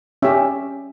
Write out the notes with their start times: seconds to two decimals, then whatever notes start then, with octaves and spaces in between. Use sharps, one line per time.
0.22 C#4 G4 E5